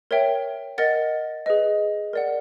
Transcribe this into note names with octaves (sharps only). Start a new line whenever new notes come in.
A#4 C#5 E5 G5
A#4 D#5 F#5 A6
G#4 B4 D#5
A#4 D5 F#5